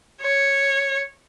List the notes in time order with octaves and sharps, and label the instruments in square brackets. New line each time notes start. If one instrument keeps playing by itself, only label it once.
[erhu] C#5